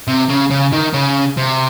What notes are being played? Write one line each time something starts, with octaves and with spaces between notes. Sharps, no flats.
C3
C#3
C#3
D#3
C#3
C3